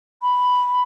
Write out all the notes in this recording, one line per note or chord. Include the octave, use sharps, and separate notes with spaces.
B5